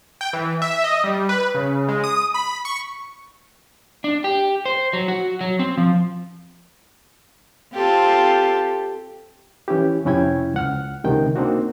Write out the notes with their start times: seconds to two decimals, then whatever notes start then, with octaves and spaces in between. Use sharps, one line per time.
0.21 G5
0.33 E3
0.62 E5
0.84 D#5
1.04 G3
1.29 B4
1.55 C#3
1.89 G#3
2.04 D#6
2.34 B5
2.65 C#6
4.04 D4
4.24 G4
4.65 C5
4.93 F#3
5.08 F#4
5.41 F#3
5.59 C4
5.78 F3
7.74 C4 F4 G4 A4
9.68 E3 C#4 E4 G4
10.05 F2 C3 C#4 E4 G5 G#6
10.54 C#2 F#5 F6
11.04 C#2 C3 D#3 G5
11.36 A#3 C4 D4 D#4 F#4